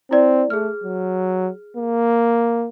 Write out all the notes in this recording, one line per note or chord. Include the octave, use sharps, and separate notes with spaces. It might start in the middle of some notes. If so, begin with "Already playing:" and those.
C4 E4 D5
A3 G#4 F6
F#3
A#3